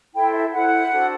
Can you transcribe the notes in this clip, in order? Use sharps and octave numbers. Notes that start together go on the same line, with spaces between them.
E4 A4 C5 G5
E5
E4 A4 C5 F#5
D4 F#4 A4 C5